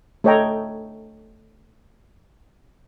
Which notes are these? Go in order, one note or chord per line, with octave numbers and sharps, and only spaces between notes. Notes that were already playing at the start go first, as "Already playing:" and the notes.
A3 A4 C#5 D#5 G5 A#5